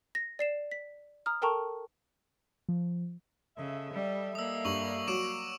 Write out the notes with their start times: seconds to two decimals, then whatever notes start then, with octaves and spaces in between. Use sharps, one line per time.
0.15 A#6
0.39 D5 C7 E7
0.72 B6
1.26 A#5 D#6 F6
1.42 A4 A#4 G5 A5 A#5 C#6
2.69 F3
3.57 C#3 A4 D#5 E5
3.93 G3
4.35 G3 A#3 D#6 E6
4.65 G2 C#6 F#7
5.08 F#3 D6 D7 E7